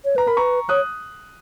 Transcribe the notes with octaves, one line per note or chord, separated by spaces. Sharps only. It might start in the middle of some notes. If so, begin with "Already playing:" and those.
C#5
B4 A#5
A#4 B5
B4 A#5 C#6
C#5 D#6 F#6